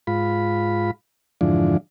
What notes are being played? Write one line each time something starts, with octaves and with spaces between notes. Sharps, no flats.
G#2 F4 B5
F2 G#2 D3 E3 F3 D4